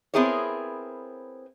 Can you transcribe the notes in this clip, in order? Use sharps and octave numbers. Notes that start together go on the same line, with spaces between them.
B3 C4 E4 G#4 A#4 C#5